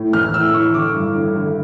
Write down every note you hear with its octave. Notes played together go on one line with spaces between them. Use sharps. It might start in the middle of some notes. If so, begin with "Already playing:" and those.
Already playing: A2
E3 F6
A2 E6
E3 C#6
D3 D6
G2
D3
D3